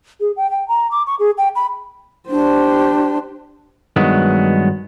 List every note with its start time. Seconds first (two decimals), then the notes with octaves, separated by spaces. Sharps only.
0.21 G#4
0.37 G5
0.51 G5
0.68 A#5
0.91 D6
1.07 C#6
1.19 G#4
1.38 G5
1.56 B5
2.29 D4 G4 C5
3.96 G2 D#3 F#3 G#3 B3